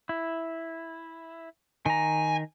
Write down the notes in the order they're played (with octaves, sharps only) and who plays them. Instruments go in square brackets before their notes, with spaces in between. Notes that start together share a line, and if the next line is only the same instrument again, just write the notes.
[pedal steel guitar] E4
[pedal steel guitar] D#3 A#5 [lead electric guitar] G#5